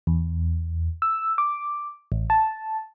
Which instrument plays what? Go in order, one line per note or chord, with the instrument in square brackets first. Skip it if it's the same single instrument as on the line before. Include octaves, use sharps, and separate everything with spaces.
[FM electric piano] E2
E6
D6
A1
A5